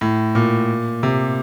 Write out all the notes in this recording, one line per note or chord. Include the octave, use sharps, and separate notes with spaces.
A2
A#2
C3